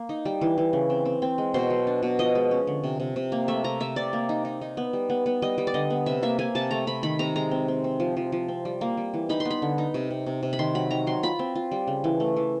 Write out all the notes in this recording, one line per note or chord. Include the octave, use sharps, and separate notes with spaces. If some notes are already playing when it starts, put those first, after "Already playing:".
Already playing: A#3
D#4
G3
E3
E3
C#3
C4
C4
C4
G#3
B2 C5
F#3
D4
B2
F3 D#5
G#3
C#4
D3
C3
C3
C3
A#3
A3 E5
C3 A#5
C3 E5
C3 D5
A#3
D#4
D#4
D#4
B3
G3
B3
B3
G3 D#5
G3
D5
D3 D#5
B3
C3 E5
A#3 E5
A#3 G#5
C3 A5
A3 A#5
C3 B5
D#3 B5
C3 A#5
G#3 A#5
C4
C4
C4
F3
F3
F3
C4
G3
A#3
G3
E3
D#4 B5
C6
B3
B5
D3
D#4
C3
C3
C3
C3
B5
D#3 C6
F#3 B5
D#3 A#5
F#3 C6
F4 B5
C4
F4
G3
C#3
E3
A3
E3